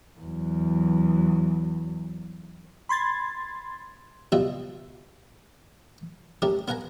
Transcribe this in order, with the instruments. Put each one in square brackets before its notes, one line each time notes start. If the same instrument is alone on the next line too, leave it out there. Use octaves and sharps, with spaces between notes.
[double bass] E2 F#3
[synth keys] B5 C6 G#6 A6
[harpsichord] C#2 B2 G3 B3 F4 E5
A3 C#4 G4 A#4
B3 A#4 F#5 G#5 A#5